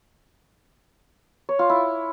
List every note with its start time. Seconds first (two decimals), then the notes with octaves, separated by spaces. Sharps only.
1.49 C#5
1.59 F4
1.70 E4